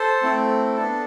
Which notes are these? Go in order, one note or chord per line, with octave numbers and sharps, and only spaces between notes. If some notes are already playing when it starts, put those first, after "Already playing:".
Already playing: A4 C5
A3 C4 E4
B3 D4 A4